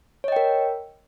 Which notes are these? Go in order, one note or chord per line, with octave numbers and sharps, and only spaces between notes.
A#4 C#5 D#5 G5